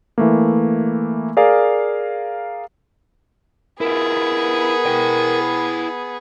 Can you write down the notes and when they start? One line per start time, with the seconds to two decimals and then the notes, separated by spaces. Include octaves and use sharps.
0.18 E3 A3 A#3
1.37 G#4 A#4 D5 F5
3.81 B3 E4 F4 G#4 A#4
4.86 E4 G5